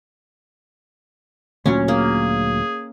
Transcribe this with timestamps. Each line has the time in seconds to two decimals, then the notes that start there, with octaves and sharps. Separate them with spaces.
1.66 D2 A#2 F#3 C#4
1.88 A#3 G#4